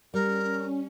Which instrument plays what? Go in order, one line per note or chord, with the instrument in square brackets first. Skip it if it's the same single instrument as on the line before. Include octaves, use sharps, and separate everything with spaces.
[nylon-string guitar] G3 [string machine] C#4 [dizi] A#4